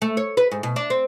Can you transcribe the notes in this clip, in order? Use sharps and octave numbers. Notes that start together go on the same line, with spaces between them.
A3
C#5
B4
G#2
B2
D4
C4